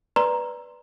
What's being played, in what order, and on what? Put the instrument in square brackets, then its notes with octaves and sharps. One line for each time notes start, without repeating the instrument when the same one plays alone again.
[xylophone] B4 D5 A#5 C6